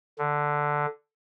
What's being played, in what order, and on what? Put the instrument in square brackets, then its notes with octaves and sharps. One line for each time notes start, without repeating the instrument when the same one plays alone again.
[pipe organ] D3